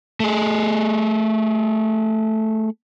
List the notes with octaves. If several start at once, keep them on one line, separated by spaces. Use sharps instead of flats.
A3 G#4